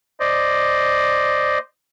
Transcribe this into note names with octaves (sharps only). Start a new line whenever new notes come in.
C5 D5 D#5